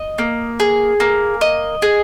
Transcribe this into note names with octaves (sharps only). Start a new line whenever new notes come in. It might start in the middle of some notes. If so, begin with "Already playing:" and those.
Already playing: D#5
A#3
G#4
A#3
D#5
G#4